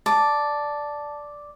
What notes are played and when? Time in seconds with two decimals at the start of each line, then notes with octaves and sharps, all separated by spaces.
0.06 D5 A5